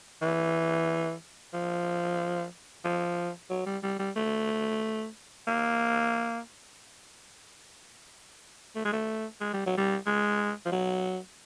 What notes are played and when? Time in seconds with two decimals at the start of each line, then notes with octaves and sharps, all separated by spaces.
0.22 E3
1.54 F3
2.85 F3
3.50 F#3
3.66 G3
3.83 G3
3.99 G3
4.16 A3
5.48 A#3
8.76 A3
8.85 G#3
8.93 A3
9.41 G#3
9.54 G3
9.66 F#3
9.77 G3
10.06 G#3
10.66 F3
10.72 F#3